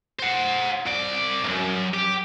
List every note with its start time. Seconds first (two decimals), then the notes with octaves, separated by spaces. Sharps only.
0.19 C5 F#5
0.87 C2 D5
1.44 B1 F#2
1.94 G4